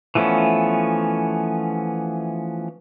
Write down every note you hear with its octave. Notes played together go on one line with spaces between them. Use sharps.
E3 F3 A3 B3 C#4